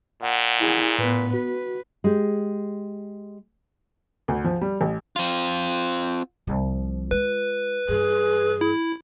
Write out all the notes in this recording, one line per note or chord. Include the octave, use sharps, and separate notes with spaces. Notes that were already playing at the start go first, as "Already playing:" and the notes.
A#2 F#5
E4 G#4
A2 B3 B4
F#4 B4
G#3 G4
D2
F3
G3
A1
C4 F4
C2 F3
G#3 F4 B4
G2 E3 G#4
E4